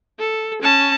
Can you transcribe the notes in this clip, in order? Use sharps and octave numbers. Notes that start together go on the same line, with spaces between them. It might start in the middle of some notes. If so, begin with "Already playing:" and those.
A4
C#4 A5